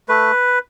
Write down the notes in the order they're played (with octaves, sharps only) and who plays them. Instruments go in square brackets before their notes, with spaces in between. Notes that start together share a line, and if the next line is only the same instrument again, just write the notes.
[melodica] A3 B4